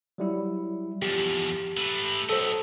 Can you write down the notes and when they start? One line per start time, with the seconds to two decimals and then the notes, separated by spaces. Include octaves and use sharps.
0.18 F#3 G3 E4
1.02 E2 F3 G4
1.77 A3 B4
2.29 F#3 A4 C5 D#5